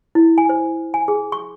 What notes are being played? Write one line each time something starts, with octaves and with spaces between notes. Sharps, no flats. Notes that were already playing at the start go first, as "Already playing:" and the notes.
E4
G#5
C5
G#5
G#4
C#6